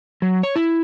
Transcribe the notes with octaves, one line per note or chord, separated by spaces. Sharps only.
F#3
C#5
E4